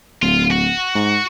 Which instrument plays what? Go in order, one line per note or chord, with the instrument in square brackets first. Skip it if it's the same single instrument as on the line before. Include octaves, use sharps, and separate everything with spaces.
[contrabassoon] D1 [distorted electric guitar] F4
[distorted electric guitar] F#4
[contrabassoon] G#2